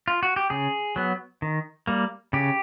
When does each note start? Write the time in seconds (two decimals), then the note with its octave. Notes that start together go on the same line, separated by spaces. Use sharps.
0.08 F4
0.23 F#4
0.36 G4
0.50 C#3 G#4
0.96 F#3 B3
1.42 D#3
1.87 G3 A#3
2.33 C#3 G4